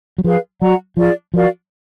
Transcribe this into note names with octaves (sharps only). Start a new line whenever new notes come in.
F#3
F3 G#4 B4 F5
F#3 F#4 D5 F#5 A#5
F3 F4 G#4 D5
F3 F#4 A#4 D5 F5